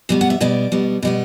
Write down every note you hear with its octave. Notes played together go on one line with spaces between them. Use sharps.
B2 G3 B3
F#5
E5
B2 G3 B3 D5
B2 G3 B3
B2 G3 B3